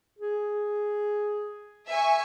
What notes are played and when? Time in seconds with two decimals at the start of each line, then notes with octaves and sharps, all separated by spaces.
0.19 G#4
1.88 E5 G#5 C#6